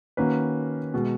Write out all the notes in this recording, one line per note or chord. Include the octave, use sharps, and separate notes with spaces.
D#3 A#3 C#4 F#4 B4
B2 G#3